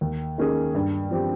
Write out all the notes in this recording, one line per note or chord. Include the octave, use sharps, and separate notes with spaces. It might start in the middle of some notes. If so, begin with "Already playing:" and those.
D#2
D#3 A#3 C#4 G#4
G2
F3 C4 G4